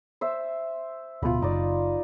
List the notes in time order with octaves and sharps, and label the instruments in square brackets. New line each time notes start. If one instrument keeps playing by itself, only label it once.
[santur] C5 E5
[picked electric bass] D1 B2 [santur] F4 B5
[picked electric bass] F#1 [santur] D#4 D5